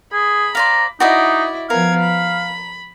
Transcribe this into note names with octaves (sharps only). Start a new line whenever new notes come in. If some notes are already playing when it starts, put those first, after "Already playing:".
G#4 B5
C5 D5 F5 A#5
D#4 E4 F#4 D5 D#5
F3 B3 A#4 F5 G#6
B5